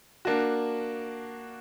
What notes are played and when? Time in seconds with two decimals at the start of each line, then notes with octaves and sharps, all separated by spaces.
0.25 A#3 D4 F#4